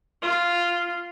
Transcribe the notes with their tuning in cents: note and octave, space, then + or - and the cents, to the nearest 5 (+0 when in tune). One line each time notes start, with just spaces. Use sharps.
F4 -5